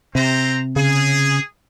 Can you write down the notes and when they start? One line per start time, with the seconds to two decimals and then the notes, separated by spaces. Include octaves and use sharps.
0.15 C3 C4 C5 A#5
0.76 C#3 G#4